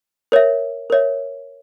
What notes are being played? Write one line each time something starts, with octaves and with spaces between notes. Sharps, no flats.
A#4 C#5 E5
A#4 C#5 E5